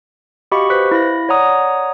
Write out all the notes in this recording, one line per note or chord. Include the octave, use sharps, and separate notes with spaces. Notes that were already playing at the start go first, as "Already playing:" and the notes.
F#4 G4 D#5 F5 B5 C#6
B4 C5 F#6 B6
E4 F5 B5 A#6
C#5 D5 F#5 A#5 D#6